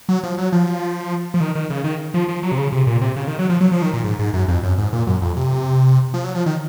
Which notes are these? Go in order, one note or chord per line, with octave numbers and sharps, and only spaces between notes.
F#3
F3
F#3
F3
F3
D#3
D#3
C#3
D#3
F3
F3
F#3
C3
C#3
C3
A#2
C3
C#3
D#3
F#3
F3
F#3
F3
D#3
A#2
G#2
G#2
F#2
F2
F#2
G#2
A#2
F#2
F2
C3
F3
F#3
F3
D#3